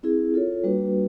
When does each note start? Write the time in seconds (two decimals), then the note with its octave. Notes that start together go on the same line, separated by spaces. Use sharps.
0.03 C4 E4 G#4
0.34 F4 A4 C#5
0.64 G3 A#3 D4 F#4 B4